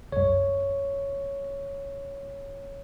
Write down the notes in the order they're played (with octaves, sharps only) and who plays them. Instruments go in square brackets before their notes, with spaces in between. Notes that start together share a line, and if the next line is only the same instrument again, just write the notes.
[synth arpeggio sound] C2 F#2 [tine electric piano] C#5